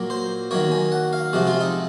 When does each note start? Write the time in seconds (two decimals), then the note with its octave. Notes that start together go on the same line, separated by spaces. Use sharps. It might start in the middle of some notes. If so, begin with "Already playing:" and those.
Already playing: A#2 F#3 A#3
0.10 C5
0.51 D#3 F#3 A#3 C#5
0.72 G#5
0.92 F#5
1.13 F5
1.33 C3 F3 G#3 F#4
1.47 F4
1.61 D#4